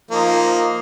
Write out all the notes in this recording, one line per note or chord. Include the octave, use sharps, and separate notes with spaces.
F3 A#3 D#4